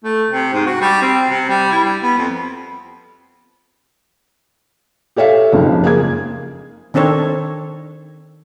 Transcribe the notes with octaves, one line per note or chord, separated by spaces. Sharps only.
A3
C3
G#2
F#4
G3
C4
C3
G3
E4
G3
B3
F2
G4 A4 C#5 E5 F5
F#1 F2 G#2 C#3 F3
A#3 G#4 G#6
D#3 C4 D4 A4 C#5